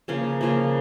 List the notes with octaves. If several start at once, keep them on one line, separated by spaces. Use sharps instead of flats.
C#3 F3 A#3 C#4
C#3 F3 A#3